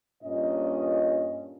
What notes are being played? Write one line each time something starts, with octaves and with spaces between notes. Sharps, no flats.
G2 A#2 C#4 D#5